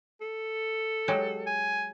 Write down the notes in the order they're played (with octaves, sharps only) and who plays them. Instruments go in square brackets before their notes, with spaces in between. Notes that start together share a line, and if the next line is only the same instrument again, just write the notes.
[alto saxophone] A4
[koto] F#3 G#3 G4
[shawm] G#5